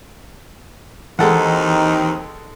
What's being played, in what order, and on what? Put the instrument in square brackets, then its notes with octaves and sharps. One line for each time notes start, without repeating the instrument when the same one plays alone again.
[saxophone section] D#2 C4 D#4 [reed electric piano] E3 [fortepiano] G#3 A4 F#5